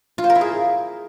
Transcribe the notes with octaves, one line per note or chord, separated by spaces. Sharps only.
F4
C5
A#4
E4
G#4